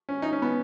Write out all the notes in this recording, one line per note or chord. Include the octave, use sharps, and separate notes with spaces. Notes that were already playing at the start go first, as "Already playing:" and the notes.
C#4
D#4
C#4
B3